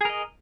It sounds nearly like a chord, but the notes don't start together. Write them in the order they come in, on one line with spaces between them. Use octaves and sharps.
G#4 A#4 D#5